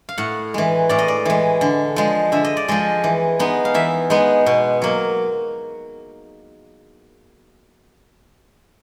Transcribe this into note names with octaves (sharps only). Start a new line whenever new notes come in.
F5
A2 F#5
E3 G#3
A2 D5
D#5
D5
E3 G#3
D3
F3 G#3
D3 E5
D#5
D5
F3 G#3 D#5
E3
G#3 B3 D#4
F5
E3 E5
G#3 B3 D#4
B2
F#3 A#3